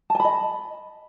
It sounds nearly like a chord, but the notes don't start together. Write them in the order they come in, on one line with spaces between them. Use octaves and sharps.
A5 G#5 B5 D#5